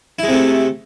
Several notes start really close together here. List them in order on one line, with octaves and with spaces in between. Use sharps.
E4 G#3 C3 A3